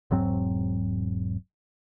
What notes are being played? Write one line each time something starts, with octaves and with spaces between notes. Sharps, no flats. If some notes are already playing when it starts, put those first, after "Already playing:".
E1 G#2 F#3 C4